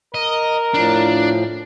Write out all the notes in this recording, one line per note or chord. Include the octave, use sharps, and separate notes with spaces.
A#4 D#5
A2 F3 D4